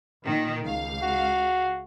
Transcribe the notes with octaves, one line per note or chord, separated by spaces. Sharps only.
A#2 D#3
C#2 F5
F#4